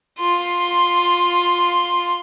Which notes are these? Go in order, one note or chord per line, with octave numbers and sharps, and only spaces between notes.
F4 C6